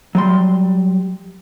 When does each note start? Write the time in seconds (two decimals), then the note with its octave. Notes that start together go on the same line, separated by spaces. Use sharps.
0.15 F#3 G3 C6